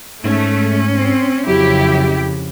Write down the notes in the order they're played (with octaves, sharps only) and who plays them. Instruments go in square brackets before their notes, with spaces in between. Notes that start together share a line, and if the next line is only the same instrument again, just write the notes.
[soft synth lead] G#2 [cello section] A3 [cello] C#4
[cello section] C4
[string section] F2 C#3 [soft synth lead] F#3 [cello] E4 [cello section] G4